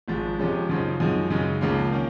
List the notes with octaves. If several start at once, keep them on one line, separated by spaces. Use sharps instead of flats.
G#1 G#2 F3 G#3
F2 C3 F3 G#3 C#4
F#2 C#3 F3 C4 D#4
F#2 F3 G#3 D#4
F#2 C#3 G#3 D#4
C#2 C#3 F3 A#3
D#3 A#3 C#4